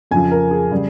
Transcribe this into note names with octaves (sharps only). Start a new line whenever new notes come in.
F2 C#3 F3 G#5
A#4
G#4
C#3 G3